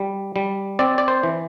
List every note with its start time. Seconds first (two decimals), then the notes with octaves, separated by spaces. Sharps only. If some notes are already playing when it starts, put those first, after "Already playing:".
Already playing: G3
0.36 G3
0.79 C4 D5
0.98 D5
1.08 C5
1.23 E3